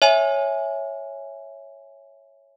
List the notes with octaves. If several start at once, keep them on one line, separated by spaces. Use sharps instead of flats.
C#5 E5 G#5